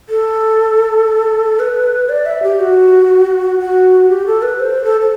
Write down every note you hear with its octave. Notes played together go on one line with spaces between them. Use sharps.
A4
B4
D5
E5
G4
F#4
F#4
G4
A4
B4
C5
A4
A4